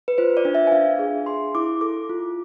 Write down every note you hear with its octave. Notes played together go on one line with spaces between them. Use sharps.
B4
F4 C5
D5
D4
E5
G#5
D4 F5
G#4
G#4 C6
E4 D6
A4 D6
F4